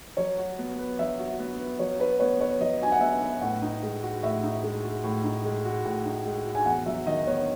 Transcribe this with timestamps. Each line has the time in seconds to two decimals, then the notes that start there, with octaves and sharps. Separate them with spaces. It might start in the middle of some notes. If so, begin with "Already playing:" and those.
0.17 F#3 C#5
0.38 F#4
0.58 B3
0.78 B4
0.99 F#3 E5
1.19 F#4
1.39 B3
1.59 B4
1.79 F#3 C#5
2.00 F#4 B4
2.20 B3 C#5
2.41 B4 C#5
2.60 F#3 D#5
2.81 F#4 G#5
2.92 F#5
3.01 B3 E5
3.22 B4
3.41 A2 F#5
3.62 D#4
3.83 G#3
4.03 F#4
4.23 A2 E5
4.43 D#4
4.63 G#3
4.83 F#4
5.04 A2
5.24 D#4
5.44 G#3
5.65 F#4
5.85 A2
6.05 D#4
6.25 G#3
6.46 F#4
6.55 G#5
6.65 E2 F#5
6.86 F#3 E5
7.06 D#3 D#5
7.27 B3 C#5